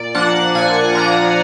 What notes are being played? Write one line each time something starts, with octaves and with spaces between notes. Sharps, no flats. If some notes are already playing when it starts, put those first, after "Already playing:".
Already playing: A#2 D5
F3 A#3 D4 F#5
A#2 G#5
F3 A#3 D4 A#5